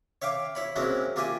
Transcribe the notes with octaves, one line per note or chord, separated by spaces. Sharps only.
C#5 E5 F5 G5 D6
E4 C#5 B5
F#3 G#3 A#3 C4 C#4 E4
A#3 F4 G4 E5 G5 G#5